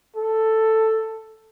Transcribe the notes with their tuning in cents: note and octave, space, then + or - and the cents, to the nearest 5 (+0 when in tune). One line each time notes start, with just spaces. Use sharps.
A4 +5